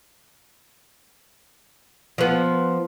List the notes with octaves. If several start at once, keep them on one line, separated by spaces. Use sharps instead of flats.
F3 B3